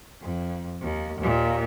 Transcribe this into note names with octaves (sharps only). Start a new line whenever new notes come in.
F2
D#2
D#2 A#2